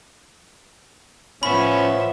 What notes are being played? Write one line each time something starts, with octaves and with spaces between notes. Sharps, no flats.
A2 F3 B3 C#4 E5 B5